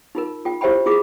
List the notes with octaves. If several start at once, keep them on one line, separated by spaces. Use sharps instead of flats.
D#4 F4 A#4
F4 G5
E4 G4 C5 E5 G5 B5
E4 F4 G#4 D6